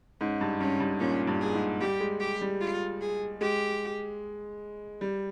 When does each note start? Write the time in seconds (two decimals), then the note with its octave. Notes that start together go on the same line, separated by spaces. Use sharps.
0.21 G#2 C#4
0.41 G2
0.60 G2 C#4
0.80 G2
1.00 A#2 C#4
1.27 G2
1.41 G#4
1.54 G#2
1.80 G3 G4
2.00 G#3
2.20 G4
2.41 G3
2.61 F4
3.01 G#4
3.41 G#3 G4
5.01 G3